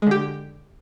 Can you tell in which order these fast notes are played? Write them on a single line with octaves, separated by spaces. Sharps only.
G#3 D3 G4